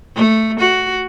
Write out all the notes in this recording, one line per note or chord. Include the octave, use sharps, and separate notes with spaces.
A3
F#4